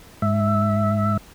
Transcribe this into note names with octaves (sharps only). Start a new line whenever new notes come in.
G#2 E5